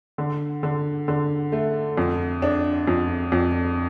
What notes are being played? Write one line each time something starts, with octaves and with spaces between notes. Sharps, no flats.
D3
D3
D3
A3
F2
D4
F2
F2